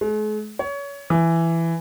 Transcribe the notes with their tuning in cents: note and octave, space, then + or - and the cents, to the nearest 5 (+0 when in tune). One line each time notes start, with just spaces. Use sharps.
G#3 +45
C#5 +25
E3 +10